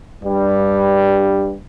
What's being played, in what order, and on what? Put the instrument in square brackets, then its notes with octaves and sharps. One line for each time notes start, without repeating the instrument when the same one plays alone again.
[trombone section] G2 G3